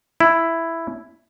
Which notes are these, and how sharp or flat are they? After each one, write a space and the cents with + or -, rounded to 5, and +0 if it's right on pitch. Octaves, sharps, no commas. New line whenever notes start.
E4 +5